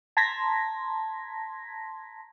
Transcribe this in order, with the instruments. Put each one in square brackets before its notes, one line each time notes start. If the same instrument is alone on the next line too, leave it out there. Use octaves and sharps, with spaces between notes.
[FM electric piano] A5 A#5 C6 G#6 A#6 B6